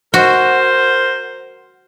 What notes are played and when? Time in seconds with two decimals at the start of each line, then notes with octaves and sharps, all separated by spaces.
0.14 F#4 A#4 C5